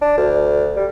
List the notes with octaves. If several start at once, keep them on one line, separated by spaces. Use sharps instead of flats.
D4
D2
G3